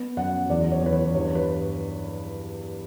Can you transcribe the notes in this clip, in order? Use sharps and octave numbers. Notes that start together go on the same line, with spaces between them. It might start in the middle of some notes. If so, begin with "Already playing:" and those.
Already playing: B3
F#2 F#5
E2 D5
C#5
E2 B4
C#5
G2 C#5
B4